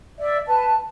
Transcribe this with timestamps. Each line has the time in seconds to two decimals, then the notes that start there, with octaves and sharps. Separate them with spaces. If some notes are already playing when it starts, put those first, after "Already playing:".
0.19 D5 E5
0.46 B4 A5